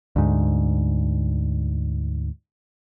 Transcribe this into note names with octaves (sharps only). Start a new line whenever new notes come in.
D2 G#2